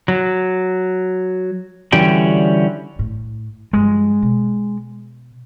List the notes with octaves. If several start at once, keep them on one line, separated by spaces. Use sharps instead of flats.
F#3
D3 E3 G3 C#4 F#4 G5
A2
G2 F3 G#3
B2